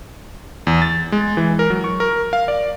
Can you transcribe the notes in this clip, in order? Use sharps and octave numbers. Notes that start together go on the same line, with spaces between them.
E2
A6
G#3
E3
A#4
F#3
C#6
A#4
F5
D5